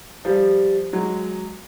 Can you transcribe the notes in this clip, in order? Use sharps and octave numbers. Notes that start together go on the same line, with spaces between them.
F3 G3
F#3 G#3